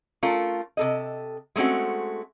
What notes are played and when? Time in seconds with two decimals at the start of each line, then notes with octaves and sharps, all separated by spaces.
0.23 A3 C#4 F4 A4 A#4
0.77 C3 A4 D#5
1.56 G#3 A3 C4 C#4 F#4